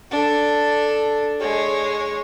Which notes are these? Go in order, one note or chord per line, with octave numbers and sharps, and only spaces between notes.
D4 A4
G#3 C#5